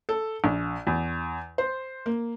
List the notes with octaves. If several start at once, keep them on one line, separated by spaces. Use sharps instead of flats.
A4
A#1
E2
C5
A#3